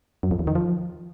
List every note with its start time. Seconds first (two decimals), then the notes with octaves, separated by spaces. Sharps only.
0.23 F#2
0.31 F2
0.39 E2
0.47 D#3
0.55 F3